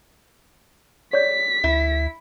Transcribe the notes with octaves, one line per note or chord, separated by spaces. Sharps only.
C#5 D5 G6 B6
D2 E4